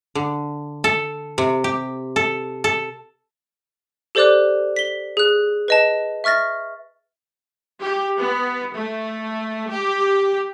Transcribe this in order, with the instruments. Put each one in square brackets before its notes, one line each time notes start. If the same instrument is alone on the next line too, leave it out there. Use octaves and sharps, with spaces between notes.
[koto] D3
A4
C3
G4
A4
A4
[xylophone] G4 A4 C5 D5 D6 F#6
B6 G7
G#4 F#6
B4 D#5 A5
E5 C#6 F6 A6 A#6
[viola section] G4
B3
A3
G4